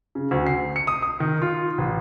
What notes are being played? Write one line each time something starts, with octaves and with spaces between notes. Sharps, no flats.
C#3
D2
C7
C#7
D#6
D#6
D#3
F4
A1